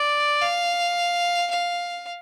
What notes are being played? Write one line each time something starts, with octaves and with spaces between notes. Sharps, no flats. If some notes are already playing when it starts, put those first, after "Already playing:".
Already playing: D5
F5
F5